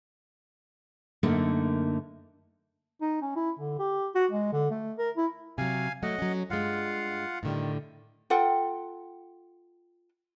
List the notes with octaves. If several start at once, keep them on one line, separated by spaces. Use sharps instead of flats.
F#2 D3 A3 A#3 D#4
D#4
C#4
E4
D3
G4
F#4
G#3
D3
A3
A#4
E4
C3 F#3 F5 G#5
F#3 A3 D#5 F#5
F#3 C#4
G2 G#3 F4 F5 F#5
A2 D3 D#3 G3
F4 A4 F#5 G5